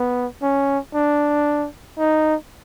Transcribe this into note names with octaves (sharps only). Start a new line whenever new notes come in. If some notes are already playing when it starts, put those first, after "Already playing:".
Already playing: B3
C#4
D4
D#4